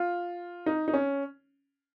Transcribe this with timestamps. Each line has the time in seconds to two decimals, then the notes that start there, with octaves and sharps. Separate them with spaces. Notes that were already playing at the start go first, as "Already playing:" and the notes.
Already playing: F4
0.66 D#4
0.88 D#4
0.93 C#4